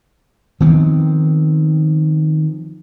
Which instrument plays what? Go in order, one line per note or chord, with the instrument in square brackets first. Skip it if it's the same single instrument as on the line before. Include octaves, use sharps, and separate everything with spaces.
[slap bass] D#3 F3 B3 C4